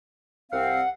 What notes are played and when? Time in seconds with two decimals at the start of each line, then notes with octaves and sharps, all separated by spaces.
0.52 C2 C4 F5 F#5